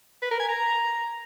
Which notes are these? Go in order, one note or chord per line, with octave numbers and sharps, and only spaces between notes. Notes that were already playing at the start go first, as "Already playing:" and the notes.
B4
A#4
G#5
A#5